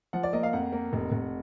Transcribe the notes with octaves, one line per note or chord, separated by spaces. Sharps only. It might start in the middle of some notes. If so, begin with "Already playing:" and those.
F3 F#5
D5
A#3 D#5
F5
F2 F#5
A#3
F1
F1